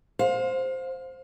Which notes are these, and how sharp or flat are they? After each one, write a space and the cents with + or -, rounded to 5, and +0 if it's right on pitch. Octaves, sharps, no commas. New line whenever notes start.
C5 +0 F5 +30